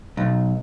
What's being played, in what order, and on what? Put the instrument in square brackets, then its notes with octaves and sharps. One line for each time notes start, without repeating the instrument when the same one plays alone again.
[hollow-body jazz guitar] B1